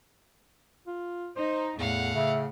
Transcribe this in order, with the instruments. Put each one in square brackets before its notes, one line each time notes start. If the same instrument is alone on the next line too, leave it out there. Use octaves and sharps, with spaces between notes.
[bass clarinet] F4
[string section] D#4 [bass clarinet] C5
[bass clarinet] E2 [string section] A2 [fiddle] F5 F#5
[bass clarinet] C#3 [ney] E5